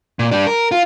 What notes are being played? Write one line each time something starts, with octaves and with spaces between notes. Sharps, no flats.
A#2
G3 D4
A#4
F4